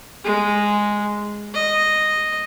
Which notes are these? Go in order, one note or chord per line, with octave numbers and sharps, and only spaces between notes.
G#3
D#5